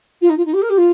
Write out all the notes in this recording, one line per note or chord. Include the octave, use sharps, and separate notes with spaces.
F4
D#4
F4
D#4
G4
A#4
G4
F4